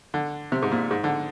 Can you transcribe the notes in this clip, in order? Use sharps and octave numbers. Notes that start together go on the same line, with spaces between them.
D3
C3
G#2
A#2
G#2
D3